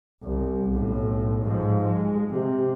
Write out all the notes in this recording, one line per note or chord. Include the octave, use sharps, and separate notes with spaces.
C2
B1 A2
G#2 F3
G#3
C3